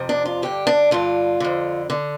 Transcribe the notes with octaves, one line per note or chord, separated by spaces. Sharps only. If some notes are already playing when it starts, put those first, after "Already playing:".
Already playing: F2 C3
D4
F4
G2 D3 G4
D4
G2 D3 F4
F2 D3
D3